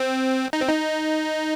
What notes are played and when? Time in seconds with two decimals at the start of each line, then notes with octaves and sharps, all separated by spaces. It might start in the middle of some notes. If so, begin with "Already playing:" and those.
Already playing: C4
0.53 D#4
0.61 C4
0.69 D#4